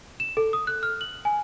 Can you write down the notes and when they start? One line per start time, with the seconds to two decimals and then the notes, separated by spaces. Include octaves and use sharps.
0.20 E7
0.37 A4
0.53 D#6
0.67 F#6
0.83 F6
1.01 F#7
1.25 G#5